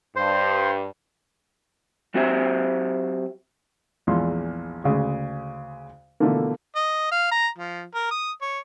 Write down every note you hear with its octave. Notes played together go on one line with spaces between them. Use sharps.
G2 C5
F#3 C4 F#4 G4 C5 E5
A#1 E2 G#3 C6
D2 C#3 G#3
B2 D3 E3 F3 A3 A#3
D#5
F5
A#5
F3
A#4
D#6
C#5